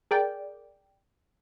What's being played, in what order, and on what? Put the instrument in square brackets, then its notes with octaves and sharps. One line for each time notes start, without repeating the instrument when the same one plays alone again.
[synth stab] G#4 A#4 D5 G5